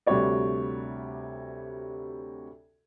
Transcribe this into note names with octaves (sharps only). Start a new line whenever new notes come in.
D2 C3 G3 F#4 C#5 D5